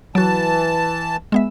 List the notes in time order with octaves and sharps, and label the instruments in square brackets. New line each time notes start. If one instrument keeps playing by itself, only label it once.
[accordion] E3 A5 [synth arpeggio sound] F#3 F#4
[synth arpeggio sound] G#3 B3 E5